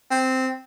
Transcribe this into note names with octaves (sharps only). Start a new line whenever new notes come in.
C4